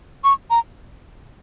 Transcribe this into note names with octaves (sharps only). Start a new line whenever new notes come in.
C#6
A#5